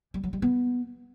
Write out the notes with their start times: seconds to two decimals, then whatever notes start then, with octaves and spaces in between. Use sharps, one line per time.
0.14 G3
0.23 F#3
0.33 G3
0.42 B3